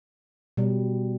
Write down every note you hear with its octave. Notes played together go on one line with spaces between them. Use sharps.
B2 G3